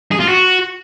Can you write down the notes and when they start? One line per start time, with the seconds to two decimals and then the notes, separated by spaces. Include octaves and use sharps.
0.12 G#4
0.20 F4
0.28 F#4